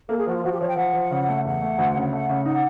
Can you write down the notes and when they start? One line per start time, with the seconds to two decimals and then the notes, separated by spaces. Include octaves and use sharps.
0.09 A#3 A4
0.18 G#4
0.26 F3 F#4
0.35 F4
0.43 F3 F#4
0.52 G4
0.61 F3 C#5
0.68 G5
0.77 F3 F#5
0.93 F3
1.11 C#3
1.28 A3
1.45 E2 F#5
1.62 A3
1.79 D2
1.96 C#3
2.13 A3 F#5
2.29 C#3
2.45 D#4 F#5